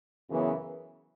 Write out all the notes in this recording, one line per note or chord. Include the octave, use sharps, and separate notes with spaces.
F#2 C#3 E3 B3